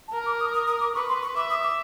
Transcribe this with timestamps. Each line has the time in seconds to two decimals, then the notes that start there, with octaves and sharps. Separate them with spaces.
0.08 A5
0.13 A#4 A#5
0.26 D6
0.41 D#6
0.54 D#6
0.67 D#6
0.81 D6
0.95 B4 C#6
1.09 C6
1.22 C#6
1.36 E5 D6
1.50 D#6
1.63 D6